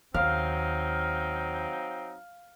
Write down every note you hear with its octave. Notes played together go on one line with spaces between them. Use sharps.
D#2 F#3 C4 C#4 D#4 F5